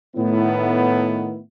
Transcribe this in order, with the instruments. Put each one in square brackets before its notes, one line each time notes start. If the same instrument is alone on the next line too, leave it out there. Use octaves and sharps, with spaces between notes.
[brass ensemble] A2 D#3 B3 E4